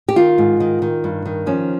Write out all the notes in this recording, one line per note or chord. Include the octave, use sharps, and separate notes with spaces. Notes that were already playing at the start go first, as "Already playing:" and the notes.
G4
D#3 F4
G#2
D#3
D#3
G2
D#3
F3 C#4